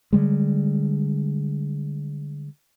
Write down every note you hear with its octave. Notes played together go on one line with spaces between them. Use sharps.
D3 G3 G#3